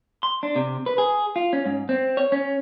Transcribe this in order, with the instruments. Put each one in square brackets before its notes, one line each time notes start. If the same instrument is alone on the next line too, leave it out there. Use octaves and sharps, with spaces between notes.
[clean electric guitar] C6
D4
C3
B4
G#4
F4
C#4
G#2
C4
C#5
C#4